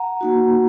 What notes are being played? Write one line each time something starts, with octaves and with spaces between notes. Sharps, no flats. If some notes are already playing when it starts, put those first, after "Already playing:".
Already playing: F#5 A#5
A#3 D#4 F#4